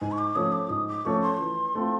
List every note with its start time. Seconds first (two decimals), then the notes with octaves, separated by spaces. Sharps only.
0.01 G#2 G#5
0.12 C#6
0.18 D6
0.36 F3 A3 C#4 D#6
0.52 D6
0.70 G#2 D#6
0.88 D6
1.05 F3 A3 C#4 C#6
1.22 C6
1.40 E3
1.75 A3 C4 F4